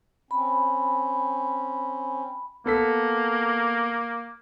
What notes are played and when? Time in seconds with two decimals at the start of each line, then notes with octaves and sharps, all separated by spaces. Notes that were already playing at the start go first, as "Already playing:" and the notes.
0.31 C4 C#4 B5
2.66 A#3 B3 A4 B6